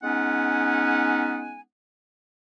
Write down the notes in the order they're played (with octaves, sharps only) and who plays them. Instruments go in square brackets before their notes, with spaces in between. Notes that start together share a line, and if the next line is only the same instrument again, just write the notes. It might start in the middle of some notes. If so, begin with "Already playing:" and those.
[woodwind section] G#3 B3 C#4 D#4 F#5 G#5